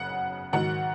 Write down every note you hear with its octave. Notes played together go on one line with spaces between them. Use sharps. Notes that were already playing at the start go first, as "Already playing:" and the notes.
Already playing: F#1 F#2 C#3 F#5
G#2 D#3 F#3 F#5